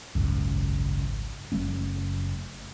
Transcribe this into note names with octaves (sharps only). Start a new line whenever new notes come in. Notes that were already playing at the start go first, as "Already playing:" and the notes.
G#1 C#2 F#2
F#1 F#3 A3 C#4